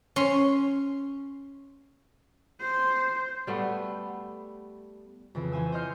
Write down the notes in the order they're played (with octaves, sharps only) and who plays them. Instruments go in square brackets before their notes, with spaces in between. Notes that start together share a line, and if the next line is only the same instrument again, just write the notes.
[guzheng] C#4 C6
[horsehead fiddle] C5
[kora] G3 A3 B3
[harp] F2 C#3 E3
E3 C5 G#5 E6
C5 C#5 D#5 C6 F6 G6